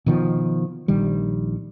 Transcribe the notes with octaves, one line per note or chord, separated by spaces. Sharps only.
B2 D#3 F3
A#1 D#3 G3